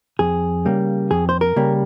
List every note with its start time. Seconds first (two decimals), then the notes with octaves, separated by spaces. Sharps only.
0.19 F2 G#4
0.65 C#3 G3 A#3
1.11 F2 G#4
1.29 C5
1.41 A#4
1.56 C#3 G3 A#3